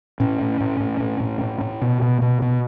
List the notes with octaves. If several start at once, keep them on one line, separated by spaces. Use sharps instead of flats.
A2 C#4
A2
A2
A2
A2
A2
A2
A2
B2
B2
B2
B2